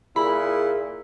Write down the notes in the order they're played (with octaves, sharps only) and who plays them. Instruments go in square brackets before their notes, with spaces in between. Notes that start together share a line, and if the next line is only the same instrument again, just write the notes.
[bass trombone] A#2 [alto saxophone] E4 [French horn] G#4 [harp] B5